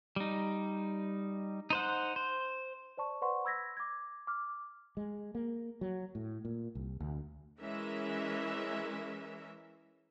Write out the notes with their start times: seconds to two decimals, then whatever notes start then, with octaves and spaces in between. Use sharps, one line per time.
0.16 G3 D#4
1.70 D#4 C5 F#5
2.16 C5
2.97 C5 D5 A5 C#6
3.22 B4 C5 D5 F#5 C6 C#6
3.45 B5 E6 G#6 A#6 B6
3.77 D6 G#6
4.27 D6 F6
4.97 G#3
5.35 A#3
5.81 F#3
6.15 A2
6.45 A#2
6.75 C2
7.00 D2
7.61 E3 G#3 C#4 A#4 E5